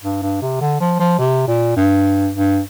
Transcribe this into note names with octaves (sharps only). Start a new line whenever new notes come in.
G2
G2
C3
D3
F3
F3
C3
A#2
G2
G2